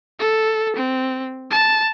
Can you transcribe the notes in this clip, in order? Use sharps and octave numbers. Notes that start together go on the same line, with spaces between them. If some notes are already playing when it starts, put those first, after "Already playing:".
A4
C4
A5